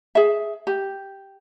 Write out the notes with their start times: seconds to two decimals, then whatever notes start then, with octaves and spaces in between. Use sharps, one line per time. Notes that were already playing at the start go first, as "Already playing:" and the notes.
0.15 G#4 E5
0.67 G4